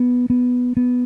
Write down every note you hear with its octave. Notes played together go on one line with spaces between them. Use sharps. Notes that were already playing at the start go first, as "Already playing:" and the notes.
Already playing: B3
B3
B3